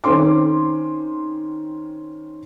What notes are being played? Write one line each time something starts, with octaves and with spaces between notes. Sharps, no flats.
D#3 C4 C#4 C6 D6